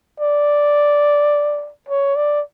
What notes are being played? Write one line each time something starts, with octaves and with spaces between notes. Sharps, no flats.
D5
C#5
D5